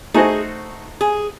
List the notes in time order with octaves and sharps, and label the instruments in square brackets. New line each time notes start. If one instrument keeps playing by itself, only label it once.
[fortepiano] A3 D#4 F#4 C5 D#5 [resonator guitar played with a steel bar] G#4
[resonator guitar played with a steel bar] G#4